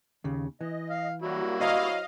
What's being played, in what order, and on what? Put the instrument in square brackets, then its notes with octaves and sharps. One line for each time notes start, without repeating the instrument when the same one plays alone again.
[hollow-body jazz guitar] D#2 C#3
[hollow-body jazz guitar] E3 [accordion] D#5
[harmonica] F5
[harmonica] F#3 E4 [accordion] G3 A#3 F#4
[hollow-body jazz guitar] C5 C#5 A#5 [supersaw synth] D#5 F5